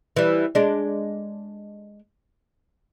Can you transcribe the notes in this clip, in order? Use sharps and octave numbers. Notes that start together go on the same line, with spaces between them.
E3 G3
G#3 D4